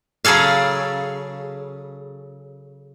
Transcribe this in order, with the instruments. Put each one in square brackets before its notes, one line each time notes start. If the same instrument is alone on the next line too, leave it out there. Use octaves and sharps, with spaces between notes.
[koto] C#3 F#3 G#4 A4 F5